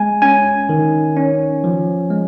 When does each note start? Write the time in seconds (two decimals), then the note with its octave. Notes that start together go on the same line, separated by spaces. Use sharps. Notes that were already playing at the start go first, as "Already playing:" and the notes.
Already playing: G#3 G#5
0.22 C#4 G#5
0.69 D#3
1.17 C#4
1.64 F3
2.10 G#3